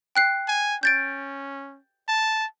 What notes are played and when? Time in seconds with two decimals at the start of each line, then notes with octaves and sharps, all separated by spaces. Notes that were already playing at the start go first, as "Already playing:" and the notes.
0.16 G5 F#6 C7
0.48 G#5
0.83 C#4 G6 A6 D7
2.08 A5